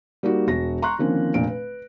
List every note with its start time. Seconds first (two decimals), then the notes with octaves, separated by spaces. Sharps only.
0.23 G3 A#3 D#4 F#4
0.47 E1 F#4 A#6
0.82 A#5 C6 C#6 F#6
0.99 D3 D#3 F3 A#3 C4 C#4
1.34 F1 A#2 D4 D7
1.47 B4